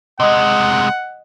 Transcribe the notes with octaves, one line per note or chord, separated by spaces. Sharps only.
C3 G#3 D#5 F#5 D#6